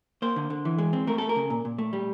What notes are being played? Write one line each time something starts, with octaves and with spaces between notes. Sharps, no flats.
A#3 C5
D3
D3
E3
G#3
C4
A3 A#4
A3 A4
A#4
C#3
A#2
A#2
A3
G3